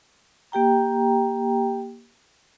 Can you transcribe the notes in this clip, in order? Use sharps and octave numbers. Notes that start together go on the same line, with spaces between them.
A#3 G4 G5 A#5